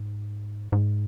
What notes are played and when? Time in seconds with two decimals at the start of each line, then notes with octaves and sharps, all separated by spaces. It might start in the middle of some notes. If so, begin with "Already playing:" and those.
Already playing: G#2
0.72 G#2